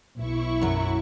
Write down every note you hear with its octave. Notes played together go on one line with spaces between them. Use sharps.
B1 E4 C#6
F#2 F#3